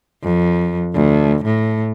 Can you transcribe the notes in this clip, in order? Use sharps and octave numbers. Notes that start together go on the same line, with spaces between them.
F2
D2
A2